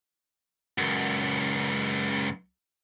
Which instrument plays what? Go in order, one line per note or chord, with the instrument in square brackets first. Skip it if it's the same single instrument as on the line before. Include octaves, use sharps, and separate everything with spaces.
[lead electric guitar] C#2 F#2